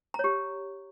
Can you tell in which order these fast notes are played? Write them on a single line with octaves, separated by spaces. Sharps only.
A#5 C#5 G4